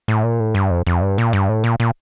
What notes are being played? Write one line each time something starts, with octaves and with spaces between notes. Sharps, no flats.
A2
A#2
A2
G2
F2
F2
G2
A#2
G2
A2
A#2
A#2